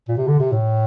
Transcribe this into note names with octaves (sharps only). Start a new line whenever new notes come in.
A#2
C3
D3
C3
A2